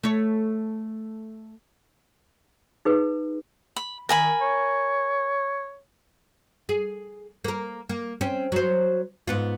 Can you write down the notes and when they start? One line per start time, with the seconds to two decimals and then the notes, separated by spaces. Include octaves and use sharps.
0.03 A3 C#5
2.85 D#4 G#4 B4
3.76 B5
4.09 D#3 A#4 G#5 B5
4.41 C#5
6.69 G#4
7.44 A#3 A#4
7.89 A#3
8.21 C4 C#4
8.52 F#3 C5
9.27 G#2 B3 F4